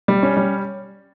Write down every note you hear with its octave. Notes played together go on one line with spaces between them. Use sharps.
G3
C#4
G3